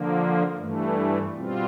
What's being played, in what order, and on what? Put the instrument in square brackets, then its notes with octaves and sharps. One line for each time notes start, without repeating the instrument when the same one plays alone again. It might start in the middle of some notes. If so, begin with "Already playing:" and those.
Already playing: [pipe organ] D3 F3 A#3
G2 E3 A3
B2 G3 C4 F4